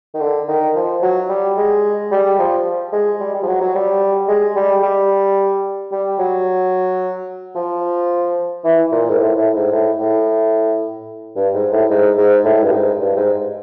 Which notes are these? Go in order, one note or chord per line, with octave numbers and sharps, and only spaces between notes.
D#3
D3
D#3
F3
F#3
G3
G#3
G3
F3
G#3
G3
G3
F3
F#3
F#3
G3
G#3
G3
G3
G3
F#3
F3
E3
A#2
G#2
A2
A2
G#2
A2
A2
G2
G#2
A2
G#2
G#2
A2
G2
G#2
G2
G#2